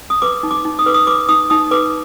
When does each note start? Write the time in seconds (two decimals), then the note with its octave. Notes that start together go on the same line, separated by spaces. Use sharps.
0.10 D#6
0.22 B4 D6
0.43 D#4
0.51 D6
0.65 D#4
0.79 D#6
0.86 B4 D6
0.94 D#6
1.07 B4 D6
1.29 D#4 D#6
1.50 D#4 D#6
1.71 B4 D6